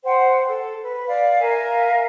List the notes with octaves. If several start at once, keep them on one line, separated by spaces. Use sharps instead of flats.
C5 F#5 G5
A4
B4
D5 F5
A#4 E5 F5 G#5